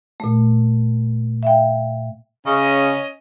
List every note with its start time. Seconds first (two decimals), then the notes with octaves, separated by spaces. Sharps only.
0.20 A#2 A3
1.43 E5 F5 G5
2.46 C#3 C#4 D#5